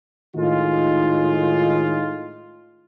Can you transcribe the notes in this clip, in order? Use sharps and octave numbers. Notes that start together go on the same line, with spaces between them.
A2 D#3 G#3 D#4 F4